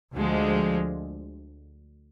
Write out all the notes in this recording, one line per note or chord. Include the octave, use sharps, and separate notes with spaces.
D2 D3 F3 G#3